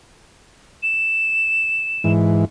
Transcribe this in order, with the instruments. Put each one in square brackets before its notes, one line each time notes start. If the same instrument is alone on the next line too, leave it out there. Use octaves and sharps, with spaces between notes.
[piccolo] E7
[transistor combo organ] G#2 E3